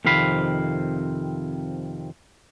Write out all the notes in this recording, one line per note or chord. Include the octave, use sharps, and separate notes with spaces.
F2 C3 D#3 C4 F5 B5